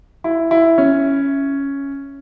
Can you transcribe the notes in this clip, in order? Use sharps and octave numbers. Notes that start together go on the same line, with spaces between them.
E4
E4
C#4